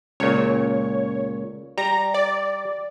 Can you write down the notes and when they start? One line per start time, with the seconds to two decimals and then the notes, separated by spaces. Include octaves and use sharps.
0.20 C#2 A#2 C#5
1.78 G3 A#5
2.14 D5